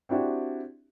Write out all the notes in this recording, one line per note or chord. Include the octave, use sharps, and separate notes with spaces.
C4 D4 E4 F#4 G4